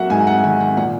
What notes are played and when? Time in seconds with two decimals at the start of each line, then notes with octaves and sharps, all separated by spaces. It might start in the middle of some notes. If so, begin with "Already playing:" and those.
Already playing: F#3 A#3 E5 F#5
0.10 G#2 G#5
0.27 F#5
0.44 D#3 F#5
0.60 F#5
0.77 A#2 F#5